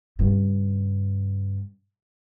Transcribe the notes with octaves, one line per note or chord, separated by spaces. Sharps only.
G2 C#3